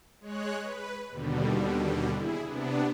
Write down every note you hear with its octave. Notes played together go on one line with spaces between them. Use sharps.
G#3 C#5 F#6
B4
D#2 B2 D3 G3
E4 G#4
C3 B3 D4